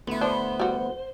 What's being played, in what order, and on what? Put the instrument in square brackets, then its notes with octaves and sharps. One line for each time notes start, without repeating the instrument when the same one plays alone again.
[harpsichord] D2 E4 [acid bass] B3
[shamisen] D4 [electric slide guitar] C5
[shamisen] G3 F#4